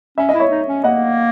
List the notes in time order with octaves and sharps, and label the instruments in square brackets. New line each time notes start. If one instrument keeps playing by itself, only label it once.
[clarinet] C#4 [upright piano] E5
[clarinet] E4 [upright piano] D#5
[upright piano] C#5 E5
[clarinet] D#4
C#4
[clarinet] A#3 [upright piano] D#5 F#5